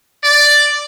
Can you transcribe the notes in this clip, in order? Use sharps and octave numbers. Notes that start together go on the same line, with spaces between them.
D5